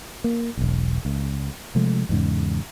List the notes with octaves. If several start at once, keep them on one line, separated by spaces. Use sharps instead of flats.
A#3
E1 B1
C#2
C3 F3 G#3 A3
E2 G#2 C#3